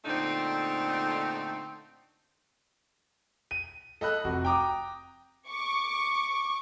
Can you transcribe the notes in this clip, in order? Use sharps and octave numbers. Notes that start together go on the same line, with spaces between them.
A#2 D3 A3 C4 D4 D#4
D#7
A4 D#5 B5 F#6
F1 F#4
G5 A#5 D6 D#6
C#6 D6